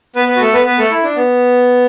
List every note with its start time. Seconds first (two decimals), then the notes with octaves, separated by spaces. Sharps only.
0.16 B3 B4
0.28 B3 B4
0.36 F#4
0.41 A3 A4
0.53 B3 B4
0.65 B3 B4
0.78 A3 A4
0.91 E4
1.03 D4
1.16 B3